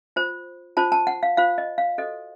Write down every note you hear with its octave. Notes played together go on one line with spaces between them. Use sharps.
F4 C5
F4 C5 A5
A5
F#5
F5
F4 C5 F5
D#5
F5
F#4 A4 C5 D#5